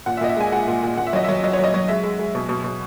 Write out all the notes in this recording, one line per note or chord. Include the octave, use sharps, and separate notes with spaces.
A#2 F#5
E5
A#2 D#5
E5
G#3 G#5
G#3 F#5
A#2
A#2
A#2 F#5
E5
F#3 D#5
F#3 E5
F#3 D#5
C#5
F#3 D#5
F#3
G#3 E5
G#3
G#3
B2
B2
B2